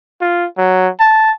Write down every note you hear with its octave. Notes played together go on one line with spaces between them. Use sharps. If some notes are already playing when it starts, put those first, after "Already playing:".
F4
F#3
A5